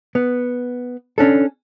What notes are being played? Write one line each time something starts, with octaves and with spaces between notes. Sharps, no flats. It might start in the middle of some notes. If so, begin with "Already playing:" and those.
B3
C#4 D4 A4